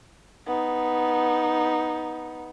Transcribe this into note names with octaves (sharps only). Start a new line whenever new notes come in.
B3 D#4